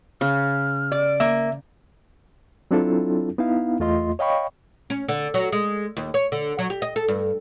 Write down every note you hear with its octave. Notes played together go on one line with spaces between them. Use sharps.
C#3 F6
D5
A#3 E5
F#3 C4 D4 E4 F4 A4
B3 D#4 E4 F5
E2 A3 F4 D#5 C6
C#5 D#5 F5 G5 B5 C#6
C#4
D3
F#3
G#3
D#2
C#5
D3
F#3
G4
D#5
A4
G2